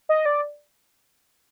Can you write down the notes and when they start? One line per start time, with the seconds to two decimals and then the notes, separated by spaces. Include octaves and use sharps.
0.09 D#5
0.26 D5